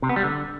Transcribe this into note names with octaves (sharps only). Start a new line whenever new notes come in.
C3
B3
G3
D3